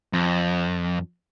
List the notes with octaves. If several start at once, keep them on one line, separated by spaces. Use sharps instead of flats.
F2